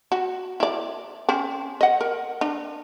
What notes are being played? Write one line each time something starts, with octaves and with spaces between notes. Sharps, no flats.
F#4
E4 D5
C4 C#4
D#5 F#5
A#4
D4